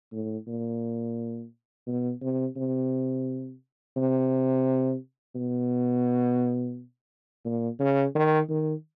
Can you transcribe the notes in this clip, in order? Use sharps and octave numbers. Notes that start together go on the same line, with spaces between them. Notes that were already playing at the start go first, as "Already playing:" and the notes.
A2
A#2
B2
C3
C3
C3
B2
A#2
C#3
D#3
D#3